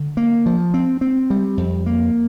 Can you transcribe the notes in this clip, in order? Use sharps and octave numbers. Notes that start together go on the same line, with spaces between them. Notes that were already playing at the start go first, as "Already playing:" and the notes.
Already playing: D3
A#3
F3
C4
C4
G3
F2
A#3